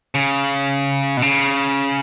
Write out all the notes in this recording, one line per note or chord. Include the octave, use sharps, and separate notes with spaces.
C#3
B2
C#3